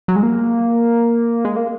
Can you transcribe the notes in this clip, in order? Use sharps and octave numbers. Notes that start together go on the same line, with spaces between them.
F#3
G#3
A#3
G#3
A#3